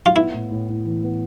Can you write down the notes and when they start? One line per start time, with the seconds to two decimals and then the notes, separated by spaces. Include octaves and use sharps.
0.06 F4
0.15 B3 E4
0.34 A2
0.51 A2
0.68 A2
0.85 E3
1.03 B3